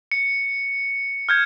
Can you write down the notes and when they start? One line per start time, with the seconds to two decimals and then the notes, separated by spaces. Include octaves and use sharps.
0.11 C#7
1.29 F6 G6 G#6